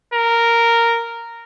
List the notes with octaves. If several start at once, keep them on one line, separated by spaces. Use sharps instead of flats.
A#4